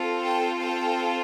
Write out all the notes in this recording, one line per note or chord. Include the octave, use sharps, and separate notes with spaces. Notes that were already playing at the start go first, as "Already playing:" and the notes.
Already playing: C4 F4 A4
G5 A5
G5 A5